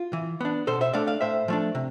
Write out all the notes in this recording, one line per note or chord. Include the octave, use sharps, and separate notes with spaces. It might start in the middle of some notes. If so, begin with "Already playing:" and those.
Already playing: F4
E3
B3 D4
B2 A4 C5
C5 E5
A3 D4 D5 F5
D5 F5
A2 C5 E5
F3 A3 D4
C3